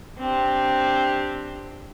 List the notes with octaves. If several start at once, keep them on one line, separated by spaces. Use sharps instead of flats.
C4 D4 G4